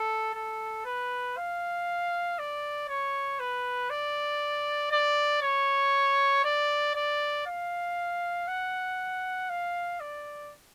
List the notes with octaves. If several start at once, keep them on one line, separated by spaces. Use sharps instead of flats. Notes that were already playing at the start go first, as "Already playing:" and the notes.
Already playing: A4
A4
B4
F5
D5
C#5
B4
D5
D5
C#5
D5
D5
F5
F#5
F5
D5